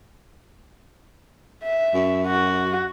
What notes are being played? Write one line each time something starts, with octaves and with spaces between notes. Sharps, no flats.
E5
F#2
F#4